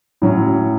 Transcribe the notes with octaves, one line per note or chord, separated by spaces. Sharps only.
A2 F#3 C#4